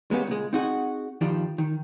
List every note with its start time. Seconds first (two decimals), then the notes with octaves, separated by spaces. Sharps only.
0.11 G#3 A#3 B3 C#4 F#4 G4
0.27 C#2 A#2 G#3
0.53 C4 D#4 F#4 G#4 F#5
1.21 G2 D#3 F3 G3 D4
1.58 D#3